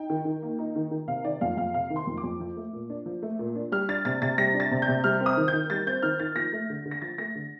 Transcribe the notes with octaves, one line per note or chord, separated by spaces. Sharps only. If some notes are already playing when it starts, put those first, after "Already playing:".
Already playing: D#4 G5
D#3
D#3
A#3
D#4
D#3
D#3
C3 F5
D#3 D5
F2 F5
F2 F5
C3 F5
D#3
C6
F2
D6
F2
F3
A3
A#2
D4
F3
A3
A#2
D4
G3 F6
D4 A6
C3 A6
C3 A6
G3 A#6
D4
A6
C3
G6
C3
G3 F6
C4
D#6
D#3
G6
D#3
G3 A6
C4 G6
D#3 F6
D#3 A6
F3 A#6
A3
D3
D3
A#6
F3 A6
A3 A#6
D3